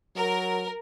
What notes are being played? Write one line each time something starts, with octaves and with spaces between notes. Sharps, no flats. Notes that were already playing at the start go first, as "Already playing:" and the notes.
F#3 A#4